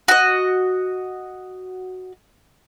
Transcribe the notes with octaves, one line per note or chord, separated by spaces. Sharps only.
F#4 D#5